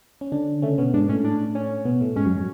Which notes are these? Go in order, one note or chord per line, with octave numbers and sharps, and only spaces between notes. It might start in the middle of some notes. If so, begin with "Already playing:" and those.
C#4
D3 D4
C#3 A3 C#4
B2 B3 C#4
G#2 G#3 D4
A2 A3 C#4
D4
C#4
B2 B3
A2 A3
G#2 G#3 C#4
F#2 F#3
F#3